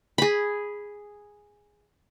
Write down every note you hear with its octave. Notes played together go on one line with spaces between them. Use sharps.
G#4 B5